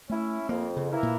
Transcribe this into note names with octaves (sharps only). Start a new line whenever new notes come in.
A3 C#4 E4
F2 A#3
C#3
E3 A#3 E4 A#4
A#2